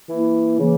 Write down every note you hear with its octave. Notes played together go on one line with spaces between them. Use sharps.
E3 A#3 E4
C#3 E3 A#3